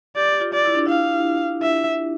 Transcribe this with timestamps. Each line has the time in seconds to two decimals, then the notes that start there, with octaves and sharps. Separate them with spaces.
0.16 G4 D5
0.40 F4
0.53 D5
0.65 E4
0.75 D4
0.86 E4 F5
1.62 E5